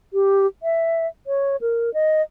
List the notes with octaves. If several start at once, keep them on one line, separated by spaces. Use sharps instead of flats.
G4
E5
C#5
A#4
D#5